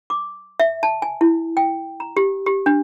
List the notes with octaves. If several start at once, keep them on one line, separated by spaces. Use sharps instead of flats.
D6
E5
A5
G#5
E4
G5
A#5
G4
G4
D4